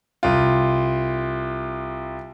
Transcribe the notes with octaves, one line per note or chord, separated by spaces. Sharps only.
C2 F4